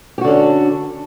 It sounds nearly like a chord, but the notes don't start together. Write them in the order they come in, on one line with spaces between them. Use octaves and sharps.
G4 F#4 D3 C#4 D4